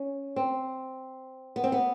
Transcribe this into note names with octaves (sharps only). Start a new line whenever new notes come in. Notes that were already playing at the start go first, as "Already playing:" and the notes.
Already playing: C#4
C4
B3
C4
B3